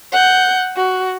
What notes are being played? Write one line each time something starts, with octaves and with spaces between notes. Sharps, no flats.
F#5 G6
F#4